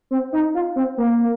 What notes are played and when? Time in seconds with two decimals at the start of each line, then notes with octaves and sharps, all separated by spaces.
0.11 C4
0.33 D#4
0.55 F4
0.76 C4
0.98 A#3